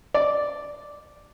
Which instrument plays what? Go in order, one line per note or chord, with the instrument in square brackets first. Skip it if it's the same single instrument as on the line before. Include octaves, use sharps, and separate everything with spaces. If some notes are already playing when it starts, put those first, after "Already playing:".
[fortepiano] D5